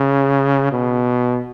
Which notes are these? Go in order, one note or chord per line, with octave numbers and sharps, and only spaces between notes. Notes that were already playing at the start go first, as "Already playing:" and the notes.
Already playing: C#3
B2